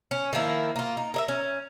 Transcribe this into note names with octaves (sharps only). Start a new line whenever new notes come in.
C#4
D#3 F3 A#3 E4
A#3 F4
D#4
A#4 D#5 E5
C#4